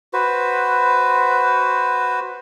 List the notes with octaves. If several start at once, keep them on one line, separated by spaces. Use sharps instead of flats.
F#4 B4 C5